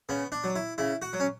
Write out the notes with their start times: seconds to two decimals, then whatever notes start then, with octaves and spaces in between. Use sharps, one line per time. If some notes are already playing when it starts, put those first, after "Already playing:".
0.09 C#3 B3
0.32 D4
0.44 F#3
0.56 E4
0.78 C#3 E4
1.02 F#4
1.13 F#3
1.20 C#4